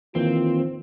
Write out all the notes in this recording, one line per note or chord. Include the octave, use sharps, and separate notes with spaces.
D#3 E3 A#3 C4 F4